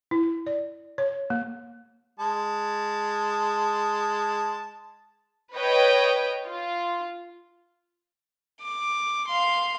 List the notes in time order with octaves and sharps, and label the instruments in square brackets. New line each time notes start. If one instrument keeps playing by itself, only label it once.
[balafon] E4
D5
C#5
A#3
[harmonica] G#3 A5
[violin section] B4 C#5 D#5 G5
F4
[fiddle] D6
F5 C6